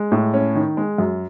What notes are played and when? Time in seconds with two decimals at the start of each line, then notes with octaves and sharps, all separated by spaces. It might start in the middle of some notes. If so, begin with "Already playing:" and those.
Already playing: G#3
0.12 A2
0.34 C#4
0.55 D#3
0.77 G#3
0.98 F#2